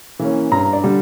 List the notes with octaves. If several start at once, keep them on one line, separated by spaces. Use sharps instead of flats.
E3 A#3 C#4
G2 A#5
D5
D3 G3